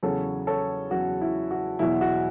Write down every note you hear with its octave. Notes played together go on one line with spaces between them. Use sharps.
E2 C#3 F#3 A4 C#5
A4 C#5
E2 C#3 F#3 F#4
E4
F#4
E2 B2 F#3 E4
F#4